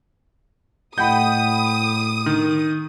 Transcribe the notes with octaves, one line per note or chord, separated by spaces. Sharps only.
A2 D#5 F#5 G5 B5 D#6 G6
D#3